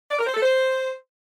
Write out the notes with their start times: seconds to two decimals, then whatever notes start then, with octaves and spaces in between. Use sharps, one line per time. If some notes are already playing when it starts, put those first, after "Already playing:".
0.11 D5
0.19 A#4
0.26 C5
0.34 A4
0.42 C5